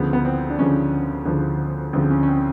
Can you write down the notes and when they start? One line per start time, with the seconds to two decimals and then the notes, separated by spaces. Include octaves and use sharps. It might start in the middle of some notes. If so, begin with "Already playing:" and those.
Already playing: D2 C#3 F3 B3
0.13 B3
0.25 C4
0.50 D4
0.59 D2 C#3 F3 C#4
1.25 D2 C#3 F3
1.93 D2 C#3 F3 C4
2.11 C#4
2.23 C#4
2.28 C4